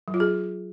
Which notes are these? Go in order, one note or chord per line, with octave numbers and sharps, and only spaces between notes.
F#3
F4
G#4